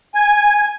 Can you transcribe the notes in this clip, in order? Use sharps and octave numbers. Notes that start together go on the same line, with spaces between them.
G#5